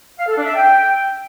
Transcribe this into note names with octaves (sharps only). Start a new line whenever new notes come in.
F5
A4
D4
E5
G5